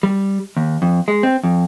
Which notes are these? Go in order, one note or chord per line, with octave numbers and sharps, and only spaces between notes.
G3
D#2
F2
G#3
C4
F2